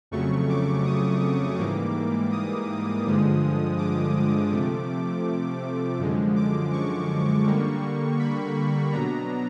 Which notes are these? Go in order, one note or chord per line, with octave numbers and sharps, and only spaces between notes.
F2 C#3 F#3 A3 C#6
D6
D#6
G#2 E3 G3 A#3 D6
D#6
G2 D3 F3 G#3
D6
C3 F3 A3
F#2 D3 F3 G#3
D6
C#6
D3 G3 A#3
B5
B2 F#3 B3 D4 A#5